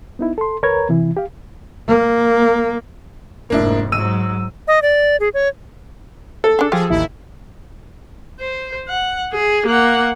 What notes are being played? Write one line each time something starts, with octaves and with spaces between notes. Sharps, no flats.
B3 D#4 E4
A4 C6
D2 A#4 B4 C#5 A#5 G#6
C3 E3 E4
G4 F5
A#3
F1 G#2 A#3 D4 E4
G#2 F#3 E6 D#7
D#5
D5
G#4
C#5
A4
D4 G#4
F3 F4 G4 G#4
A1 D#2 E4
C5
F#5
G#4
A#3 F#5